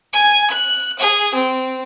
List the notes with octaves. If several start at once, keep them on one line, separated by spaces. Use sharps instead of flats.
G#5
F#6
G#4
C4